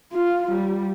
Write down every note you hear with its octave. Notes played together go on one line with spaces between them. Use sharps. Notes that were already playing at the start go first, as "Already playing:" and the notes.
F4
G3